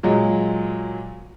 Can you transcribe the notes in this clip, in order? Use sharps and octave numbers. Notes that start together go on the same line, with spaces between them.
A#2 F#3 G#3